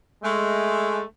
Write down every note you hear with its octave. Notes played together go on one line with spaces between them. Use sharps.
G#3 A3